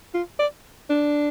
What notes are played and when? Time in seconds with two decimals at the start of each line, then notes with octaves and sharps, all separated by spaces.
0.14 F4
0.39 D5
0.90 D4